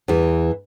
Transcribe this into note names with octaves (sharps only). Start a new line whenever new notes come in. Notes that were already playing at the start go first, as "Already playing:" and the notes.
E2 E3